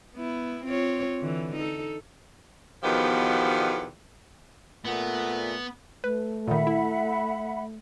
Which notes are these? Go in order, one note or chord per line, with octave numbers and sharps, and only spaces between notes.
B3 E4
C4 F4 C#5
D3 E3
D#4 A4
E2 B2 D#3 F3 B3 G4
A#2 A3 B3 F#5
A3 B4
A#2 D#3 E5 F#5 B5
E4